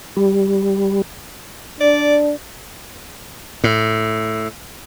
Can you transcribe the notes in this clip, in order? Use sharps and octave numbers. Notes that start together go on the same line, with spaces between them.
G3
D4 D5
A2